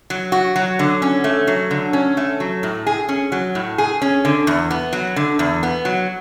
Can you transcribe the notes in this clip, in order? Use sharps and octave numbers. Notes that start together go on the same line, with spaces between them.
F#3
F#4
F#3
D3
C#4
A3
F#3
D3
C#4
A3
F#3
A2
G#4
C#4
F#3
A2
G#4
C#4
D3
E2
B3
F#3
D3
E2
B3
F#3